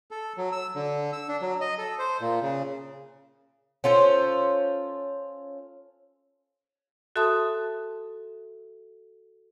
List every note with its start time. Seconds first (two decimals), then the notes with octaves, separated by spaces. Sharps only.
0.11 A4
0.37 F#3
0.52 E6
0.76 D3
1.13 E6
1.28 D4
1.42 F#3
1.61 D#5
1.78 A4
1.99 C5
2.21 A#2
2.42 C#3
3.84 C#4 F4 A4 C5
7.16 F#4 A4 E5 A5 C6 D#6